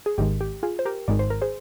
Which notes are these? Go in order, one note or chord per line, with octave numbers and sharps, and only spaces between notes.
G#4
G#1 G#2 D#3 G#3 G4
G4
F4 G#4
C5
G4 A#4
G#1 G#2 D#3 G#3 D5
C5
A#4
G#4 C5